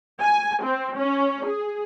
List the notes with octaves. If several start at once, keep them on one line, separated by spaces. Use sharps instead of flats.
G#5
C4
C#4
G#4